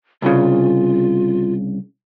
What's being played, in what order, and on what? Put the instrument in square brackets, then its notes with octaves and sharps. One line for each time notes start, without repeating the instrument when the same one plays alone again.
[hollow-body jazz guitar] C2 C#3 [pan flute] F4